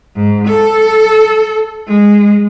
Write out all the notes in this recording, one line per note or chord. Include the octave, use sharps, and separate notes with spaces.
G#2
A4
G#3